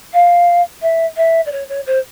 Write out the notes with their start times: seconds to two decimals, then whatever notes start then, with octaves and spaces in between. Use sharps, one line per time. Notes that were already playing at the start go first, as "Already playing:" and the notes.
0.13 F5
0.82 E5
1.17 E5
1.46 D5
1.51 C#5
1.68 C#5
1.86 C5